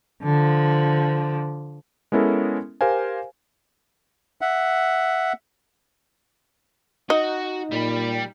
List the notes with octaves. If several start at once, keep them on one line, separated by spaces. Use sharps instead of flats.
D3 F3
G#3 B3 C#4 E4 A4 A#4
G4 A#4 C5 F5 G#5
E5 F#5
D#4 F#4 D#5
A#2 G3 B5